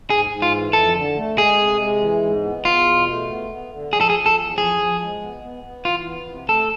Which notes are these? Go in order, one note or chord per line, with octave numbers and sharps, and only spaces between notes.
G#2 G#4
G#2
F4
E3
F2 A4
D3
A3
G#3 G#4
C3
G#3
E3
G#2
B3
E2 F4
B2
A3
B3
B3
D3
F3 G#4
A4
G#4
F3
A4
E2
F3 G#4
F3
G#3
B3
B3
B3
E3 F4
B3
C3
A3 A4